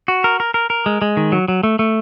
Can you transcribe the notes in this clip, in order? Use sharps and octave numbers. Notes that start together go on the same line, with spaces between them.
F#4
A#4
A#4
A#4
A#4
G#3
G#3
D#3
F#3
F#3
A3
A3